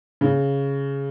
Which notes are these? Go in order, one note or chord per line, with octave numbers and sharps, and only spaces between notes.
C#3